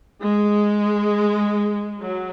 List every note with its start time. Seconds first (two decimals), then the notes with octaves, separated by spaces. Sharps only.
0.22 G#3
2.01 F#3